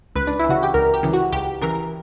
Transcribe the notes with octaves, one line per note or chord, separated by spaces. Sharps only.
C#2 B4
D4
E3 E4
C#3 F#4
G4
C#2 A#4
G4
C#3 E3
F#4
C#2 G4
C#3 E3 A#4